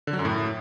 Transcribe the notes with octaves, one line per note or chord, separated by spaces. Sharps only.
D3
F#3
F#2
A2